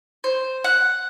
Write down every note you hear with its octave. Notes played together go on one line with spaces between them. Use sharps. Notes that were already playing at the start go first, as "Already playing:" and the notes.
C5
F#5